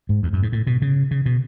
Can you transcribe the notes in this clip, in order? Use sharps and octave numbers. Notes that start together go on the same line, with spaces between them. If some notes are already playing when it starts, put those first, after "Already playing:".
G#2
E2
F#2
G#2
A2
B2
C#3
C#3
B2